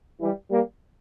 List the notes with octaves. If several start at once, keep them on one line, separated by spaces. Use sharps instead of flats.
E3 G3
G3 A#3